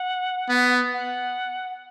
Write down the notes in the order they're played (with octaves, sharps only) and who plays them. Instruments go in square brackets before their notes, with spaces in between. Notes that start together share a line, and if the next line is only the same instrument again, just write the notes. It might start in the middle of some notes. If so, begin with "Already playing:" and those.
Already playing: [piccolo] F#5
[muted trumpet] B3
[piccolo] F#5